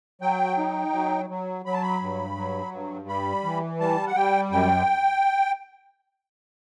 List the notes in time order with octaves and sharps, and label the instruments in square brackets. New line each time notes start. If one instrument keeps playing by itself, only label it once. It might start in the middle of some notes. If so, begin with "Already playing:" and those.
[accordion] F#3 G5
D#4
F#3
F#3
F#3 B5
A5
B5
G2
F#3
G2
G3 B5
E3
G3 A5
F#5
G3 G5
F#2 G5